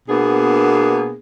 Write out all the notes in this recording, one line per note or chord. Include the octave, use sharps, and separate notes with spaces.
B2 A#3 B3 D4 G#4